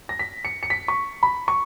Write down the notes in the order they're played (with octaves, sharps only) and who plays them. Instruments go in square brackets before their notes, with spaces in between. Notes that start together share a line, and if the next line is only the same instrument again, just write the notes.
[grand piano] A#6
B6
C#7
C#7
B6
C#6
B5
C#6